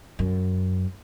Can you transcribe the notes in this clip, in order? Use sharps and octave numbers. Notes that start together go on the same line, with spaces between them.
F#2